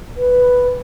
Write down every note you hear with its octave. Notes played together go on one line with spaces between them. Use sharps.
B4